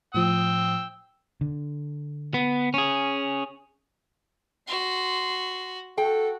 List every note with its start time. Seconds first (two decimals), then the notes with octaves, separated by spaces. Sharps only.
0.15 A2 F3 G5 D#6 E6
1.41 D3
2.34 B3
2.74 C#4 G#4
4.68 F#4 C6
5.98 F#4 A4 G5